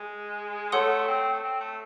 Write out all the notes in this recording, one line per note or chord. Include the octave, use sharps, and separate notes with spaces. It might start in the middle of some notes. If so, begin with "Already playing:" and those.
Already playing: G#3
A3 A4 C#5 F#5 C6 D#6
C4
A3
C4
A3